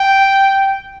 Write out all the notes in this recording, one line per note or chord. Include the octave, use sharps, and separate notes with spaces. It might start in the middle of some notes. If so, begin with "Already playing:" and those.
Already playing: G5